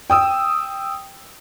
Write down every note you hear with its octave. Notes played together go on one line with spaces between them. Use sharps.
G5 D#6 E6